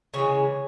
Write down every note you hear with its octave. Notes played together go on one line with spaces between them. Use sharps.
C#3 E3 G#3 C#5